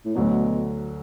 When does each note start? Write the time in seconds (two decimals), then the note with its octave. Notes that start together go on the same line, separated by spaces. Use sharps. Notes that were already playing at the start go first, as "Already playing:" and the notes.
0.05 A2
0.15 D2 B2 D3 F#3 A3